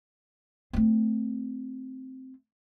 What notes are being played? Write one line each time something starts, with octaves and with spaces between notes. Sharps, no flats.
A3 C4